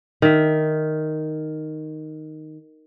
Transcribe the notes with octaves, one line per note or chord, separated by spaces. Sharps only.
D#3 E5